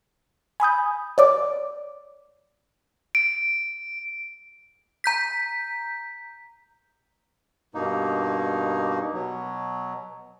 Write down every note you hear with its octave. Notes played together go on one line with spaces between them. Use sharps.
G#5 B5 D#6 G6
C#5 D5 D6
D7
A#5 G6 B6
G2 B2 A#3 D#4
B2 F#3